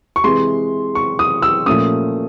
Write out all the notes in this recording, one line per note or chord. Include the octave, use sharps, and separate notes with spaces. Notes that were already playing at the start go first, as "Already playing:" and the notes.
C#6
C3 E3 G#3 C6
C#6
D#6
E6
A#2 F3 A3 C#4 D#6